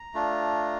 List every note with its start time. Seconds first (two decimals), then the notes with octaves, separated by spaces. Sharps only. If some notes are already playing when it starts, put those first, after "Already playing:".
Already playing: A#5
0.14 A3 D4 F4